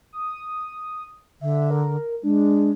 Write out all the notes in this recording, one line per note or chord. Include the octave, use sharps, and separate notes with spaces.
D#6
D3 E5
A#4
G#3 D4